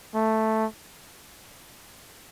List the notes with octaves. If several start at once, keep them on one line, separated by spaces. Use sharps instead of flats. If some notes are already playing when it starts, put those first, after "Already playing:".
A3